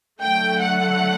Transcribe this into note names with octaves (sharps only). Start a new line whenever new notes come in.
D3 F#3 A3 G5
F#5